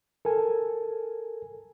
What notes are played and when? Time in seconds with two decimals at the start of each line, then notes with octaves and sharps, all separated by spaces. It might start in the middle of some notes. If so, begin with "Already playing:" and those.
0.25 A4 A#4 G#5